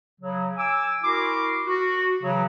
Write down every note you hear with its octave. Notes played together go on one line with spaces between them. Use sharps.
C#3 F#3
G#5 D6 E6
E4 F#4 A#4 C6 D6
F#4
C#3 E3 F#3